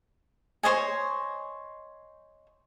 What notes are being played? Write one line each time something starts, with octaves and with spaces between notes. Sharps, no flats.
C5 C#5 D#5 G#5